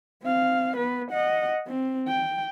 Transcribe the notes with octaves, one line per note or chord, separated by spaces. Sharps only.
C4 F5
B3 B4
D#5 F#5
C4
G5